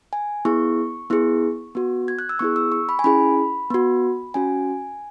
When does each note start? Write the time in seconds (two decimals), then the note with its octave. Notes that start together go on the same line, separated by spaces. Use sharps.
0.13 G#5
0.45 B3 E4 G#4 C#6
1.10 B3 E4 G#4
1.75 B3 F#4
2.08 G#6
2.19 F#6
2.29 E6
2.39 B3 E4 G#4 C#6
2.56 E6
2.72 C#6
2.89 B5
2.99 G#5
3.04 C#4 E4 G#4 B5
3.70 B3 F#4
4.34 C#4 F#4 G#5